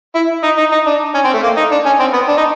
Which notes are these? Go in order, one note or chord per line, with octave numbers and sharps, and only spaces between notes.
E4
D#4
D#4
D#4
D4
C#4
C4
A3
A#3
D#4
D4
C#4
C4
B3
D4
D#4